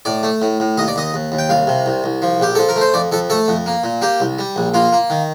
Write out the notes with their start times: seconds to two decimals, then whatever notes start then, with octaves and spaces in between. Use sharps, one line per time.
0.05 A2 D5
0.23 A3
0.42 A2
0.60 A2
0.77 D#2 D#5
0.88 D5
0.96 D#2 D#5
1.14 D#2
1.32 D#2
1.39 G5
1.49 C2 F5
1.67 C3
1.86 C2
2.04 C2
2.22 F3
2.40 A#1 G4
2.55 F3 A4
2.69 A#4
2.76 A3
2.81 C5
2.94 F2 D5
3.12 F2 A4
3.30 A3 A4
3.48 F2
3.66 A#3
3.84 A#2
4.02 A#3 G4
4.20 C2
4.39 G3
4.56 A#1
4.74 A#3 F4
4.92 A#3
5.10 D#3